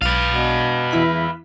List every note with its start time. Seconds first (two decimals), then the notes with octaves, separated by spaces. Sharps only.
0.02 B1 B4 F5 A6 D#7
0.28 B2
0.91 E2 E4 B6